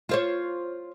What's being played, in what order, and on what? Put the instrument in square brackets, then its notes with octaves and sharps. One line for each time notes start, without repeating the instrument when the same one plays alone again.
[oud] F4 C5 C#5